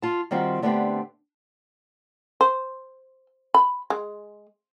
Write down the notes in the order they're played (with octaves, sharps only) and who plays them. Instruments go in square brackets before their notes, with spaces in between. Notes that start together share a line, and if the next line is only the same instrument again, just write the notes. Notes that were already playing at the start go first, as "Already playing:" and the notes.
[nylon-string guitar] F4 A5
D#3 G3 C4 F4 F#4
D3 A3 B3 C4 D4 G4
[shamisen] C5
B5
G#3